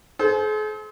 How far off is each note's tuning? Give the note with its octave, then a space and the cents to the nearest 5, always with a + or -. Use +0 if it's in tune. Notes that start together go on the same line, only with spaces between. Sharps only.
G#4 +45 C5 -10